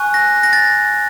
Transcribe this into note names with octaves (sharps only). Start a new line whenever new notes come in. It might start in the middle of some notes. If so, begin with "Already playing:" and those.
Already playing: G#5 C#6 F#6
A#6
A#6
A6